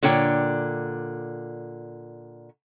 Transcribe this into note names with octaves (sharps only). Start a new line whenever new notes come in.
A#2 D3 C#5 G5